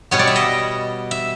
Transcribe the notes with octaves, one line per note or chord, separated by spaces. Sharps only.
B2 G3 B3 C#5
D5
E5
D#5
E5